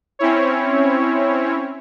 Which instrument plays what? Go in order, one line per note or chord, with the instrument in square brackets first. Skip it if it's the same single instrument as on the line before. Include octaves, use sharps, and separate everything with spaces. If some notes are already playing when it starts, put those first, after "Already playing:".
[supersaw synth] C4 C#4 E4 C#5